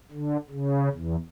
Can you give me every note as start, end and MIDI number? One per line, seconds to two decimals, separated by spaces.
0.12 0.37 50
0.50 0.89 49
0.93 1.16 40